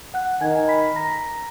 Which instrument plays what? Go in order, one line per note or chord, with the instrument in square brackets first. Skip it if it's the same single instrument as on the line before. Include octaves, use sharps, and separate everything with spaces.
[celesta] F#5 F#6
[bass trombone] D#3 [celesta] G#5 G#6
[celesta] B5 B6
A#5 A#6